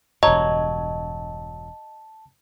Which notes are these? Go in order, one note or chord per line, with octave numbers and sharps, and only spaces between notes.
E1 G2 F#3 D#5 A5